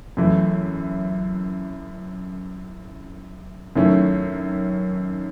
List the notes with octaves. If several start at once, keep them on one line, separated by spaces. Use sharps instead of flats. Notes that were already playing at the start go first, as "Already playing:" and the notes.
F#2 E3 A3 E4
F#2 D#3 A3 C#4 E4